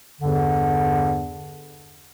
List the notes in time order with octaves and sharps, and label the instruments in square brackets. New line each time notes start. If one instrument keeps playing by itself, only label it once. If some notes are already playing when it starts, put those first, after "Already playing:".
[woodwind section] E2 G2 D3